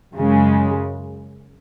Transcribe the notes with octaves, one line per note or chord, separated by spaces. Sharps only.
F#2 C#3 G#3